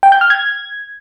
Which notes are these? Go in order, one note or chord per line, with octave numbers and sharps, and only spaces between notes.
G5
G6
F6
G#6